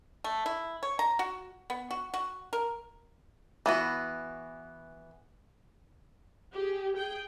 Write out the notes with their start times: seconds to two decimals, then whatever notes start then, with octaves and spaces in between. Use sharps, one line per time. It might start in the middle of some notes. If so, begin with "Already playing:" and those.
0.24 A3
0.46 E4
0.83 C#5
0.99 A#5
1.19 F#4
1.70 B3
1.91 F#4
2.14 F#4
2.53 A#4
3.66 E3 B3 F#4
6.54 G4 G#4
6.96 G#4 G5